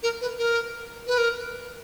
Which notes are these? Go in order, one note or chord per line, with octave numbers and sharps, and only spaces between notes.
A#4
B4
A#4
B4
A#4